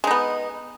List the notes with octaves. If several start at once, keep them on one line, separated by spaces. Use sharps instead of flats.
G#3 B3 D#4